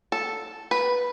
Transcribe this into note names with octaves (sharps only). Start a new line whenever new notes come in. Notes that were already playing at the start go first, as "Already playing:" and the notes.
A4
B4